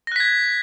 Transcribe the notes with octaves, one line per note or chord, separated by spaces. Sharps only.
F#6 G#6 A#6 B6